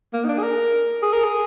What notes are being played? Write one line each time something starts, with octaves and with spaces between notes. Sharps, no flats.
A#3
D#4
D4
G#4
A#4
G#4
A#4
G#4